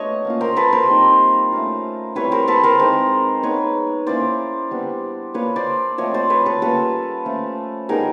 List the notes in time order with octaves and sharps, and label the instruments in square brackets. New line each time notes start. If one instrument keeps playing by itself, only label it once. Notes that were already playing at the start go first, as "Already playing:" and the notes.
Already playing: [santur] A3 B3 D4 F4 C#5 D#5
A#3 C#4 F4
A#4 C5
A4 B4
A#4 C5
G3 C4 D#4
A3 C#4 F4
G3 C4 E4 B4 C#5
A#4 C5
A4 B4
A#4 C5
G#3 C4 D#4 A#4 C5
G#3 B3 D#4 B4 C#5
A#3 C#4 E4 C5 D5
G3 B3 D4
A#3 D4 F4 B4 C#5
C5 D5
F3 A3 C4 C#5 D#5
C5 D5
B4 C#5
A4 B4
G3 A#3 C#4 F4 A4 B4
F3 A3 C#4 F4
G3 B3 D#4 G#4 A#4